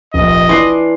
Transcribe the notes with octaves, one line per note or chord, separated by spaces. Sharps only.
F1 A#1 D#5
E3 D4 C6 D6 C7